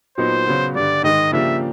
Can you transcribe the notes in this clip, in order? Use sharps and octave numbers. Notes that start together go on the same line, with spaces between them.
A#2 F#3 B3 D#4 C5
C#3 F#3 B3
G2 D3 G3 D5
G#2 D#3 G#3 D#5
C#3 F3 A#3 D4 G4 E5